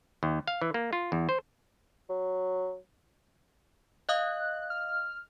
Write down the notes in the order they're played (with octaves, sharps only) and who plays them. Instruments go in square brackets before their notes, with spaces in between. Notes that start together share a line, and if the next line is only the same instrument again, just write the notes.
[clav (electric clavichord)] D#2
F5
E3
A#3
F4
E2
C5
[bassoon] F#3
[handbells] D#5 F5 D#6 [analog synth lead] F#6
[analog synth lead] F6